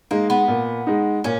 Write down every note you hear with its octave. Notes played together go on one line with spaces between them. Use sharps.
G#3 A#3 D#4
B3
A#2
G#3 D#4
A#2 C#4